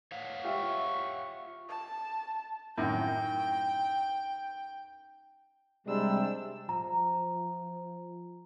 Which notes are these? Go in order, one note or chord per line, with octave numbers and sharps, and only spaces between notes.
C#5 F5 F#5
F4 G4 E5 C#6
A5
F#2 A2 D#3 G5
C3 G3 G#3 D4 E6
F3 A#5